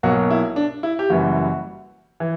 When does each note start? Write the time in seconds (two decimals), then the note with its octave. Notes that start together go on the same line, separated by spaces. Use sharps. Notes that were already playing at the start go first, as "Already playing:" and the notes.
0.03 B1 B2 F#3 A#3 F#4
0.30 E4
0.56 D4
0.83 E4
0.99 G4
1.10 F#1 F#2 E3 G3 F#4
2.20 E3